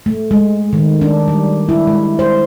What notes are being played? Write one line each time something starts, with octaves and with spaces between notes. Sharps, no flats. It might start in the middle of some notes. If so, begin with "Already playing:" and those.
A3
G#3
D#3
D4
G3
E4
G#3
C5